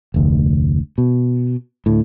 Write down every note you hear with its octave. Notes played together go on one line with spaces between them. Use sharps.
F1 D2
B2
D2 A2